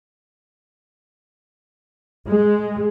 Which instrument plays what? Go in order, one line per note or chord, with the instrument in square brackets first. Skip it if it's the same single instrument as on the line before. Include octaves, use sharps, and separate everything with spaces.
[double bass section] G#3